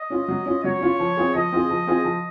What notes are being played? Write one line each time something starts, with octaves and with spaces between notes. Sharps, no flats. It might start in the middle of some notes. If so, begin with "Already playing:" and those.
Already playing: D#5
C#4 F4
F#3
C#4 F4
F#3 C#5
C#4 F4
F3
C4 F4 G#4
F3 D#5
C4 F4 G#4
F3
C4 F4 G#4
F3